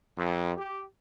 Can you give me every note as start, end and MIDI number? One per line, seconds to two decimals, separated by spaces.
0.16 0.51 41
0.57 0.83 67